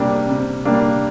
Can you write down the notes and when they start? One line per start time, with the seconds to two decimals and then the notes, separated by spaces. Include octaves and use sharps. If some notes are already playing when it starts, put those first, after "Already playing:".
Already playing: C3 G3 A#3 D4
0.27 C3
0.65 G3 A#3 D4